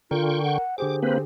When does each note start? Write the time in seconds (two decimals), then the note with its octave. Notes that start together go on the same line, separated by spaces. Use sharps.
0.11 D3 F4 A#4 G5 C#6
0.44 F#5
0.78 D3 G4 G#4 C5 D6
1.03 A#3 C4 B4 C5